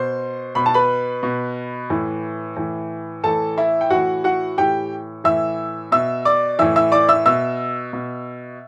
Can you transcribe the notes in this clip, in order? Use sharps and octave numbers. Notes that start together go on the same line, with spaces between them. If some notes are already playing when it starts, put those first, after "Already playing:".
Already playing: B2 C5 C6
B2 B5
A5
B4 B5
B2
A2 E3
A2 E3
A2 E3 A4 A5
E4 E5
G5
A2 E3 F#4 F#5
F#4 F#5
A2 E3 G4 G5
A2 E3 E5 E6
B2 E5 E6
D5 D6
A2 E3 E5 E6
E5 E6
D5 D6
E5 E6
B2 E5 E6
B2